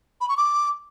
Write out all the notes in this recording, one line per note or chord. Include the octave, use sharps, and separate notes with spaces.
B5
C#6
D6